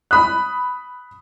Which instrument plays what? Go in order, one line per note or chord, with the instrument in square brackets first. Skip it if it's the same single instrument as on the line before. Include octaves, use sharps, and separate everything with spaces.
[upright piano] B5 D#6 F#6